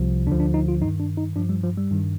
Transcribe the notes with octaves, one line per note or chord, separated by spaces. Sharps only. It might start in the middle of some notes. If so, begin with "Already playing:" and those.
Already playing: C2 C3 F3
D2 D3 F3 D4
D4
D#4
F4
G2 D#3 D#4
D4
D#4
G2 F3 D4
G3
F3
G3
G2 D#3